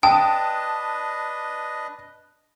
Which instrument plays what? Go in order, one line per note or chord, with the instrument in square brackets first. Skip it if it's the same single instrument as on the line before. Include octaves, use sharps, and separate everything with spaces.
[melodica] D4 B4 D#5 [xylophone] G5 [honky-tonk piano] A5 D#6